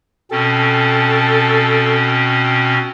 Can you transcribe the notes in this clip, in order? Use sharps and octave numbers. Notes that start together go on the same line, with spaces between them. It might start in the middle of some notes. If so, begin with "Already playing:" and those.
B2 C4 C#4 A4